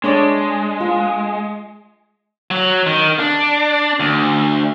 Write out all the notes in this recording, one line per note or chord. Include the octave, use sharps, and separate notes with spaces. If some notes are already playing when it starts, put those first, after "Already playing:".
G#3 D4 C#5 D5
F4
F#3
D#3
D4
D2